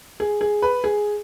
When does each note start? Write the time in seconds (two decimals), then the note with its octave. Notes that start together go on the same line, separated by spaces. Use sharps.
0.20 G#4
0.41 G#4
0.62 B4
0.84 G#4